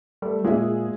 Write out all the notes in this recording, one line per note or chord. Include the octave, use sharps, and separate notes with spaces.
G3 A3
A#2 G#3 G#4 E5